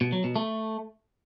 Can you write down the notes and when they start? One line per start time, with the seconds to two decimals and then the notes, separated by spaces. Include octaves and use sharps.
0.01 B2
0.12 F#3
0.24 B2
0.36 A3